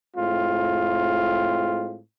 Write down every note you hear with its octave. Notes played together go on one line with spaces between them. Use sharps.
A2 G#3 C4 F4